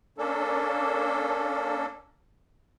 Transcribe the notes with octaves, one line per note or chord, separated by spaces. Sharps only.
A#3 C#4 D4 A4